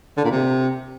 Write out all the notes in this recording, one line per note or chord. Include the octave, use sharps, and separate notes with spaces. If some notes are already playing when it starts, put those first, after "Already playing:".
D3
A#2
C3